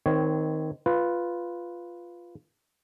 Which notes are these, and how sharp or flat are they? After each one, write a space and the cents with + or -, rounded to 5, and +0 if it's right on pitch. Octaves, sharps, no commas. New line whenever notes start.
D#3 +10 C4 -20 C#5 +0
F4 +0 B4 +0